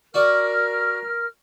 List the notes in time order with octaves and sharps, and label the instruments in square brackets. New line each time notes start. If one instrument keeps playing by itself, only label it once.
[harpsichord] F#4 D5 [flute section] A#4 F6